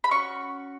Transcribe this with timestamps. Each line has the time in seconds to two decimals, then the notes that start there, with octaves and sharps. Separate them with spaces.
0.04 B5
0.11 C#4 F#4 C#6